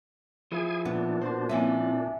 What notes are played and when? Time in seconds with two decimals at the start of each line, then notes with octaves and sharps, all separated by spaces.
0.52 F3 E4 F4 G#4 G#5
0.85 A#2 B3 D4
1.22 F#4 A#4 C5 F#5 C6
1.49 F3 A#3 C4 C#4 E4 E5 G#5